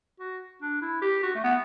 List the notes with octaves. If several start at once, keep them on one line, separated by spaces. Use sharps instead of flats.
F#4
D4
E4
G4
F#4
A3
B3